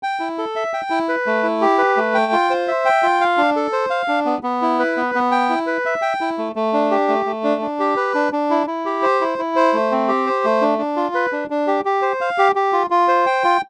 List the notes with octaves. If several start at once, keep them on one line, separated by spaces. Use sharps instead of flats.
G5
E4
A4
E5
G5
E4
B4
A3
E4
G4
B4
A3
G5
F4
C5
E5
G5
F4
F5
D4
A4
C5
F5
D4
B3
B3
E4
B4
B3
B3
G5
E4
B4
E5
G5
E4
A3
A3
D4
G4
A3
A3
D4
D4
G4
B4
D4
D4
E4
E4
G4
C5
E4
E4
C5
A3
C4
G4
C5
A3
D4
D4
F4
B4
D4
D4
G4
G4
C5
F5
G4
G4
F4
F4
C5
G5
F4